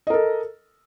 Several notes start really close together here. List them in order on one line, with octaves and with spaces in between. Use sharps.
D#5 A#4 A4